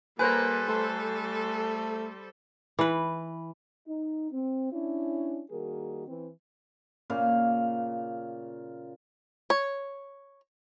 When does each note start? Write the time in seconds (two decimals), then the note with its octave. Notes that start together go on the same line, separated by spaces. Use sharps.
0.19 G3 A#3 A4 B4 C5 G#5 A#5 F#6
0.68 A3 C6
2.79 E3 B4
3.87 D#4
4.31 C4
4.72 C#4 D4 E4
5.51 D#3 G3 A#3 F#4 G#4 A#4
6.08 E3 C4
7.10 A#2 C#3 F5
9.50 C#5